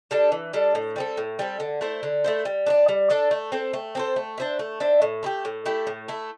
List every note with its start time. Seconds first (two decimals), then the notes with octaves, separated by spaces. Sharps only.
0.11 G3 D4 A4
0.32 E3
0.53 G3 D4 A4
0.75 A2
0.96 G3 C4 A4
1.17 A2
1.39 G3 C4 A4
1.60 D3
1.81 A3 E4 C5
2.03 D3
2.24 A3 E4 C5
2.45 G3
2.66 D4 A4 D5
2.89 G3
3.10 D4 A4 D5
3.31 A3
3.52 C4 A4 C5
3.73 A3
3.95 C4 A4 C5
4.16 A3
4.38 D4 C5 E5
4.59 A3
4.80 D4 C5 E5
5.02 A2
5.23 A3 E4 G4
5.45 A2
5.66 A3 E4 G4
5.87 A2
6.08 A3 E4